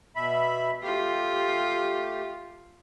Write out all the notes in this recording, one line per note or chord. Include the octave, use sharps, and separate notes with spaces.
B2 E5 B5
A3 F4 G4